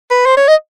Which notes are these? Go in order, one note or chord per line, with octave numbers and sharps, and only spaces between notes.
B4
C5
C#5
D#5